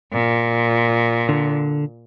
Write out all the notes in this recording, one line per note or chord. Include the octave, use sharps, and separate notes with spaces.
A#2
D3